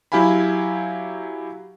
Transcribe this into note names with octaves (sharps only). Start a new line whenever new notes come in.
F#3 E4 G4 F5 G#5 B5